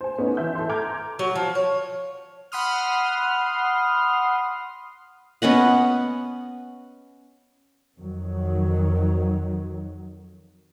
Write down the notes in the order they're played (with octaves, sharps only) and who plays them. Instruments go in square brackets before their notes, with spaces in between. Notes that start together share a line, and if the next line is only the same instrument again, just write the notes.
[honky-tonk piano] C5 G#5
B3 C#4 D#4
E3 E5 G6
A4 C6
A#5 D6 F6 G6 G#6
[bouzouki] F#3
F3
C#5
[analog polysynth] F#5 B5 C6 D#6 F6
[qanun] B3 C#4 D#5 F#5
[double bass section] F2 D#3 F#3